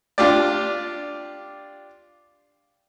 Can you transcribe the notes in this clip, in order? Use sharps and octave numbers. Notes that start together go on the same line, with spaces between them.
D4 F4 G4 D5